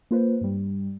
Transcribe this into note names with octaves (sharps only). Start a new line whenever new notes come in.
A#3 F4 B4 C5
G2 G3